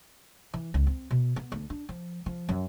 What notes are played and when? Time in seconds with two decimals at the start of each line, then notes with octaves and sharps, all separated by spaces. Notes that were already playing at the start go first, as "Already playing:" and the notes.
0.54 E3
0.74 C#2
0.87 C4
1.11 B2
1.36 B3
1.52 D2
1.70 D4
1.89 F3
2.26 F3
2.49 F#2